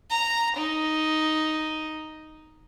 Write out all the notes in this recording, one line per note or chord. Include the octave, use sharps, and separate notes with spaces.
A#5
D#4